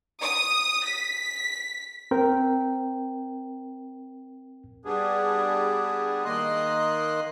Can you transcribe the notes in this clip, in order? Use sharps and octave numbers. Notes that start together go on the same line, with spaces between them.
D#6
B6
C4 A#4 G5
G3 B3 D4 G#4
D#3 A#3 D#5 C6 F#6